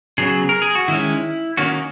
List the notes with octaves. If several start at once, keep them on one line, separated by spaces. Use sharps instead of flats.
C#3 F#3 B3 G#4
A#4
G#4
F#4
D#3 G#3 C#4 E4
D#3 A#3 C#4 F#4